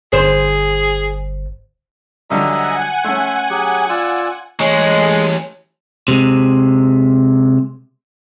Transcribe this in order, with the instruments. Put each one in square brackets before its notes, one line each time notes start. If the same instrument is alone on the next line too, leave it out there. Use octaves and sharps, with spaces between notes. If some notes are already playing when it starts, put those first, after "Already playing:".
[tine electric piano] G1 [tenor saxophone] G#4 [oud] C5
[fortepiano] G2 D3 F#3 [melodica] D#5 E5 A#5 [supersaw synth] F#5 G#5
[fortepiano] A3 C#4 [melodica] E5 C6
[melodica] F#3 G4 G#4
F4 D5 E6
[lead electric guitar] E3 C#5 [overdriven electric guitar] G#3
[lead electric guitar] C3 G#3